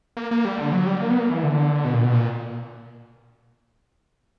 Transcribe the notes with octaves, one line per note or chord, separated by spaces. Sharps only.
A#3
A#3
G3
D3
F#3
G3
A#3
B3
A#3
E3
D3
B2
A#2
B2
A#2